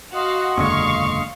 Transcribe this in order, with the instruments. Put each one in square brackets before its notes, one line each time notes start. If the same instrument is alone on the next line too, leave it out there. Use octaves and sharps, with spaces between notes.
[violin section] F#4 F5 [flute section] D#5 C6 D#6
[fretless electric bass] F#1 E2 [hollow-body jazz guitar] A#2 D3 G#3 [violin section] F5 C#6